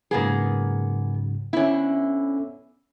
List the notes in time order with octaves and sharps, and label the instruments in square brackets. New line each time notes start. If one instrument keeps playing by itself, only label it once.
[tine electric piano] G#2 C#3 F#3 [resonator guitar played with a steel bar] A#3 B3 G#4
[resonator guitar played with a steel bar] D3 E4 [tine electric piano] B3 C#4